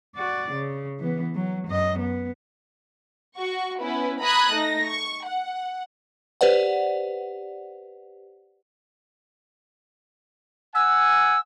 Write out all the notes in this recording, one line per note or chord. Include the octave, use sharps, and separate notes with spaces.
F#4 D5
C#3
E3 B3
F#3
F#2 D#5
B3
F#4 C#6
B3 C#4 E4 B4
A#5 B5 D#6 F#6 G#6
A3 D#4 A#6
C#6
F#5
G4 B4 C5 D5 F#5
F#5 G#5 E6